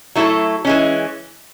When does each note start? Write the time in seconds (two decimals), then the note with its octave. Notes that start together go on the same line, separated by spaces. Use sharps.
0.15 F#3 A3 E4 A4
0.65 E3 G#3 C#4